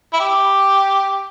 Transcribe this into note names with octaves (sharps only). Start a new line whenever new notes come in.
E4
G4